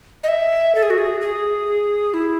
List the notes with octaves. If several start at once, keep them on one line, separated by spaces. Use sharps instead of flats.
D#5
E5
A4
G#4
F#4
G#4
G#4
E4